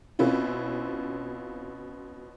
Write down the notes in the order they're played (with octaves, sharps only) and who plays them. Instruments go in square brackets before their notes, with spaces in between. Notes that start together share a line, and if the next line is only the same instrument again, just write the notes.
[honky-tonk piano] B2 C4 C#4 E4 F4